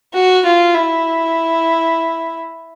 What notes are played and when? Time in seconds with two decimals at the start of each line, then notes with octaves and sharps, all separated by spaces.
0.14 F#4
0.45 F4
0.74 E4